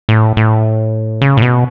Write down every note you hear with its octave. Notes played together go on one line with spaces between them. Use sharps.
A2
A2
C#3
A2
B2